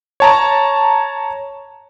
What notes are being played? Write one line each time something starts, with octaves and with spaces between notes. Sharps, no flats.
C#5 A5 A#5